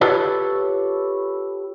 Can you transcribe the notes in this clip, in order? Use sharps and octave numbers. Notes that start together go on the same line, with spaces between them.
F4 G4 A4 B4 C#5